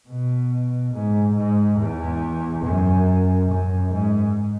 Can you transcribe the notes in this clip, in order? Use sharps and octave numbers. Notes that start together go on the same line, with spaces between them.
B2
G#2
G#2
E2
F#2
F#2
G#2